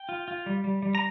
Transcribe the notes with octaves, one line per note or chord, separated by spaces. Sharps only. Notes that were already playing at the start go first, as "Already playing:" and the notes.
Already playing: G5
F4
F4
G3
G3
G3
A#5